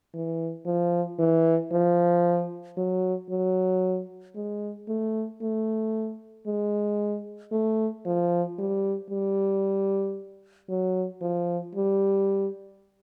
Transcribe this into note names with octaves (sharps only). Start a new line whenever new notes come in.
E3
F3
E3
F3
F#3
F#3
G#3
A3
A3
G#3
A3
F3
G3
G3
F#3
F3
G3